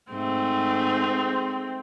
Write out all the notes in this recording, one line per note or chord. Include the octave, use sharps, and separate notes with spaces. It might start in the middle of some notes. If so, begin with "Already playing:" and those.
G#2 A3 C4 G#4